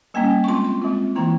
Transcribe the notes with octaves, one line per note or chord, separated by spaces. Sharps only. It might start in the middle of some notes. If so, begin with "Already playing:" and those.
G3 A#3 C#4 G#5
C#6
G#3 C4 F4 C6
C6
G#3 C4 F4
E3 A#3 E4 A#5